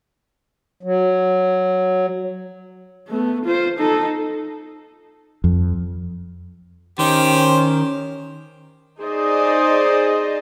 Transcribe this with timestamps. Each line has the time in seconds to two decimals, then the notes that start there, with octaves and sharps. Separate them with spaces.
0.83 F#3
3.08 A3 B3
3.45 F4 C5
3.79 D#4 A4
5.44 F2
6.99 D#3 C#4 G4 C5
9.00 D#4 G#4 C5 D5 D#5